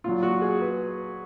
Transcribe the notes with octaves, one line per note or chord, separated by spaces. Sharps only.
A#2 F#3 F4
F#4
G#4
B4